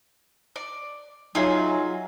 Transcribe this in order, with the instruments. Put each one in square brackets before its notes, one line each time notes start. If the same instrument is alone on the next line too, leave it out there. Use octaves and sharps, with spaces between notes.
[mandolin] D5
[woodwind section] F#3 [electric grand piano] D#4 E5 G#5 [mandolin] F4 G#4